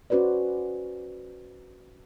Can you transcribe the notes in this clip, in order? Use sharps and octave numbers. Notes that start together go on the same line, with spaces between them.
C#4 F#4 B4 C5 D5